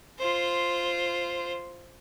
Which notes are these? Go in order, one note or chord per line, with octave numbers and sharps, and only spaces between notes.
F4 C5